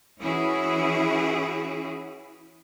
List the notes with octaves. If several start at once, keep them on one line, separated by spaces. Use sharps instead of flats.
E3 C#4 E4 F#4 G#4